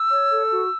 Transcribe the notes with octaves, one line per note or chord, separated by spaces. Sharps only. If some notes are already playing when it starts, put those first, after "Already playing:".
Already playing: E6
C#5
A4
F#4